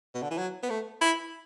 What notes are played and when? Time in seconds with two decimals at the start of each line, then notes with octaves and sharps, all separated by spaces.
0.14 B2
0.23 D3
0.31 E3
0.38 F#3
0.63 B3
0.70 A3
1.01 E4